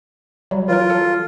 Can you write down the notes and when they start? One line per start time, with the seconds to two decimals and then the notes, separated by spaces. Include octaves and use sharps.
0.51 F#3 G3
0.68 E3 F#3 F4 A#4
0.90 A4